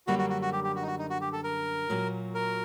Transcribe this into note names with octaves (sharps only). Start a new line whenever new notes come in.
F#2 D3 G3 A#3 F#4
F#4
F#4
F#4
G4
G4
F#4
D#4
F#4
D#4
F#4
G4
A4
A#4
A#2 F#3 A#3 F#4
A#4